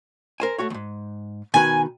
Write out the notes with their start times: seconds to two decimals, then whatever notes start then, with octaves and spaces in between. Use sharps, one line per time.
0.40 A#4 C5 G#5
0.58 A3 F#4 C#5
0.70 D#2 G#2
1.54 B2 D#3 B4 G#5